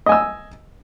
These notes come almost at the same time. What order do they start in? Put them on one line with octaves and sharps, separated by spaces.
D#5 G#5 E6